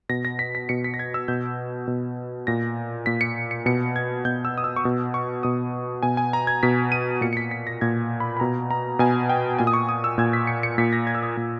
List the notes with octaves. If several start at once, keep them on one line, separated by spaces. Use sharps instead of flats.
B2 A#6
A#6
B6
B6
B2 C#7
B6
A#6
G#6
E6
B2 G6
B2
A#2 A#6
A#2 B6
C#7
C#7
B2 C#7
G#6
B2 G6
E6
D#6
E6
C#6
B2 D#6
C#6
B2 D#6
B2 G#5
G#5
A#5
G#6
B2 B6
D#7
A#2 C#7
C#7
B6
B6
A#6
A#2 G#6
B5
B5
B2 A#5
A#5
B2 G#5
G5
A#2 G#5
D#6
C#6
D#6
E6
A#2 G#6
B6
C#7
C#7
A#2 B6
A#6
G#6
E6
D#6
A#2